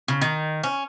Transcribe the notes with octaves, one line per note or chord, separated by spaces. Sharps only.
C#3
D#3
C#4